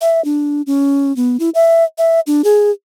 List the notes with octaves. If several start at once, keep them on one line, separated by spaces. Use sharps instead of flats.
E5
D4
C#4
B3
E4
E5
E5
D4
G#4